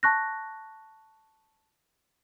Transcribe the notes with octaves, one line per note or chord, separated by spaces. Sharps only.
A5 C#6 F#6 A#6